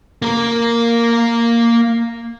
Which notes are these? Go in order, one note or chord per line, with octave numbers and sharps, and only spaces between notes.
A#3 A#4